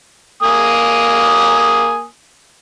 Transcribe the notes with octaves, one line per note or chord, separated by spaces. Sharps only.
A#3 G#5 D#6